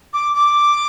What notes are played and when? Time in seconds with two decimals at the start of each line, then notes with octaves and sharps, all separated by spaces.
0.13 D6
0.34 D6